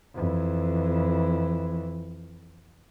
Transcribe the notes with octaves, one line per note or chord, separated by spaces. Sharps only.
F2 E3